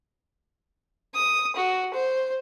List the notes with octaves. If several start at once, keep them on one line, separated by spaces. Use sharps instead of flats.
D#6
F#4
C5